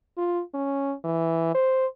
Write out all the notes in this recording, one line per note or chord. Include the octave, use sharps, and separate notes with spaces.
F4
C#4
E3
C5